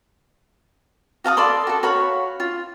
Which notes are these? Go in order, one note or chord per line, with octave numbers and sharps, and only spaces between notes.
F#4 F5 A5 D#6
A4 D5 B5 C6
F#4 A4
F#4 C#5 F5 B5
F4